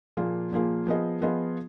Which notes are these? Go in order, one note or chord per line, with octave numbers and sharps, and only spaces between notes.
A#2 F3 A#3 F4 G#4
A#2 F3 A#3 F4 G#4
F3 B3 F4 G#4 D#5
F3 B3 F4 G#4 D#5